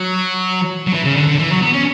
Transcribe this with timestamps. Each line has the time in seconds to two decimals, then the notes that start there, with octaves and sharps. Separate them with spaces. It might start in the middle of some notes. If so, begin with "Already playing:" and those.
Already playing: F#3
0.87 F#3
0.94 E3
1.05 C#3
1.16 D3
1.27 D3
1.39 E3
1.51 F#3
1.62 B3
1.73 C#4